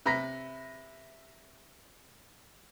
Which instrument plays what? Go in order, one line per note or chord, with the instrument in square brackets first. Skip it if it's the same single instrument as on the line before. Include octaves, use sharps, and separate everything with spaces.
[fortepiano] C3 B4 A#5 [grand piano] E5 A#6 B6